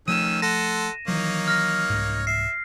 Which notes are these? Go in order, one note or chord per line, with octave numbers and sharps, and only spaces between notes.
D#3 F3 A3 C#4 E6 D#7 E7
A4 F#5 C6 A#6
D#3 E3 F#3 A#3 D#4 C#5
F6 A#6
C2 G#2
E5 C7